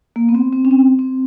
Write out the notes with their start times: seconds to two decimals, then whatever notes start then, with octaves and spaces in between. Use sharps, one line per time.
0.16 A#3
0.29 B3
0.35 C4
0.53 C4
0.65 C#4
0.71 C4
0.99 C4